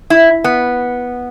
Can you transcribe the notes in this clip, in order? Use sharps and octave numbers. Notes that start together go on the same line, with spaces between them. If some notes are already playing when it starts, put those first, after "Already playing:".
E4
B3